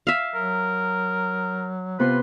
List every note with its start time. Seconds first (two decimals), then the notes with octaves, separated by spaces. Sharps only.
0.07 E5 F5
0.35 F#3 A#4
1.99 C3 B3 F4 B4 C6